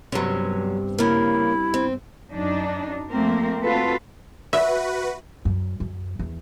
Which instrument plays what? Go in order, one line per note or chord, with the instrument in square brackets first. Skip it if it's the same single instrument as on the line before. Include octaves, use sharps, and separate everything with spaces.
[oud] G2 C3 B3 [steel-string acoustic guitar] F#3 C#4
[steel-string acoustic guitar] C#3 A#3 [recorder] E4
[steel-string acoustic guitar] C4
[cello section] F#2 D4 D#4
F3 A3 A#3 C4 A#4
C4 F4 F#4 A4 B4
[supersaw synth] F#4 B4 [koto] E5
[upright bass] F#2
F#2
E2